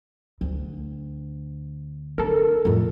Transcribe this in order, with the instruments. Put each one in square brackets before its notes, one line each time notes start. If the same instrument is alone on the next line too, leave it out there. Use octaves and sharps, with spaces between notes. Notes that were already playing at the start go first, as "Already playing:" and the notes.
[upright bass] D2
[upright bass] D3 [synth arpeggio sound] A4 A#4
[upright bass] F2 A2